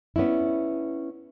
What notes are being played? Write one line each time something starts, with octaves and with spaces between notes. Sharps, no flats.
B3 C#4 D4 E4